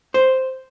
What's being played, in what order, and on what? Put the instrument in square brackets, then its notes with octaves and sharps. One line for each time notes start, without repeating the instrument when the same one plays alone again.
[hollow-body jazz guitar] C5